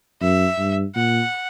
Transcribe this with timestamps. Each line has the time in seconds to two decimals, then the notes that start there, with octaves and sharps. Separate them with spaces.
0.21 F#2 E5
0.58 G2
0.95 A#2 F#5